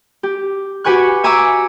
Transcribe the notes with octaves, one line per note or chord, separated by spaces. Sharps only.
G4
F#4 G4 B4 G#5 C#6 F#6
E5 G#5 A#5 C#6 D6 E6